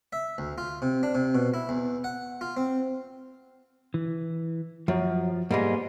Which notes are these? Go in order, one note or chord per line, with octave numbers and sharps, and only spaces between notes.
E5
D2
F4
C3
D4
C3
B2
E4
E2
F#5
F4
C4
E3
F#2 F3
G#2 G3 G#3 A#3 B3